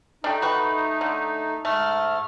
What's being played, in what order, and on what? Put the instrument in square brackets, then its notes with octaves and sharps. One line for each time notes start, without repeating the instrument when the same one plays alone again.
[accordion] A3 D#4 [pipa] D4 G4
[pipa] F#4 B4
D3
[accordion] G#2 F6 [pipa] A3